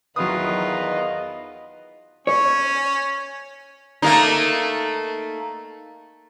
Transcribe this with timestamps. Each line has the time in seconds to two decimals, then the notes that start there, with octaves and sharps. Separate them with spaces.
0.16 E2 D#3 F#3 E4 F4 B4 D#5 D#6
2.27 C#4 C#5
4.02 A3 A#3 D#4